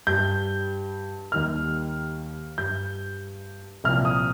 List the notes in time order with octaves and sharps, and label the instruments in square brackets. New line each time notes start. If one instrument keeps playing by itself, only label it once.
[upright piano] G2 G3 G6
D#2 D#3 G3 F6
G2 G3 G6
C2 A#2 F3 F6
D#6